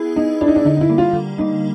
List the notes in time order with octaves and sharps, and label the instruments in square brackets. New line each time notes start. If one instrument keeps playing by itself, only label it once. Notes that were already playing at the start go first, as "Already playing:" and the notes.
Already playing: [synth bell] B3 E4 G#4
[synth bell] B3 [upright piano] D#4
[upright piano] D4 [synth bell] E4 G#4
[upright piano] D#4
D4
[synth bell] D3 [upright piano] D#4
[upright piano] D#4
E4
[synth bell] G3 A#3
[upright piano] F4
[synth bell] D3
[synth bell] G3 A#3 [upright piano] D#4